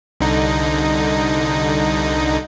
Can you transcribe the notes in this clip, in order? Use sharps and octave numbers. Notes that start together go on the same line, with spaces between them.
C2 D3 D#4